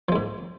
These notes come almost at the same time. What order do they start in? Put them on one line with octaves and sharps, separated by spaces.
F3 G#3 G#2